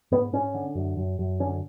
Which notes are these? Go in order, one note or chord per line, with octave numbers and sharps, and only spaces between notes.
G#2 B3
G#2 C#4
D3
F#2
F#2
F#2
D3 C#4